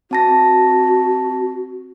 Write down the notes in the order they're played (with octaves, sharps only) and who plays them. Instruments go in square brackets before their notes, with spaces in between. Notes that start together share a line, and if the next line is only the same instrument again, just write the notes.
[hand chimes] C4 A5 A#6 [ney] F#4